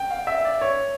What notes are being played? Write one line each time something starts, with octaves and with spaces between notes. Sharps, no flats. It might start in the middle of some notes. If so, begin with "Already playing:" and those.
Already playing: G5
F5
E5
D5
C#5